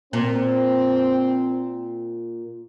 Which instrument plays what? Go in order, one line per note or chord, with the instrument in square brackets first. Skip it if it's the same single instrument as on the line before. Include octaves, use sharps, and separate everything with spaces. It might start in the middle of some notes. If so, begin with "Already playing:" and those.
[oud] A#2 [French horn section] C4